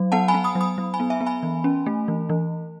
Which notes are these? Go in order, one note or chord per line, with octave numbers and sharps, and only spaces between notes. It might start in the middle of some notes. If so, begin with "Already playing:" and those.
Already playing: F#3
B3 F#5 A5
G#5 B5
B3
B5 D#6
F#3
B5 D#6
F#3
G#5 B5
B3
E5 G#5
B3
G#5 B5
E3
C#4
A3
E3
E3